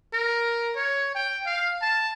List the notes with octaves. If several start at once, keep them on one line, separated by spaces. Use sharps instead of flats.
A#4
C#5
G5
F5
A5